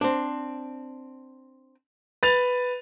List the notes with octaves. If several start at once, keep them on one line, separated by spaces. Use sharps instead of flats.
C4 D4
B4 A6 F7